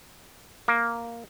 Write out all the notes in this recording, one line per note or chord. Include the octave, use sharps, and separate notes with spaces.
A#3